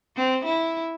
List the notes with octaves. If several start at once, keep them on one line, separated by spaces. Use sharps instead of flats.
C4
E4